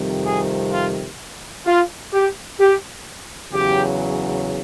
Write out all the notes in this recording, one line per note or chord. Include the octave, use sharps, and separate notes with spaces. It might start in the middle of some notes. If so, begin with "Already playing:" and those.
Already playing: F2 C3 D#3 G3
G#4
F4
F4
G4
G4
E2 C#3 F#3 G4